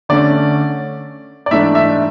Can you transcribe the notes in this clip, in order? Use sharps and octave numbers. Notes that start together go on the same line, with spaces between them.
D3 A3 C#4 D5
D5
G#2 E3 A3 D4 E5
E5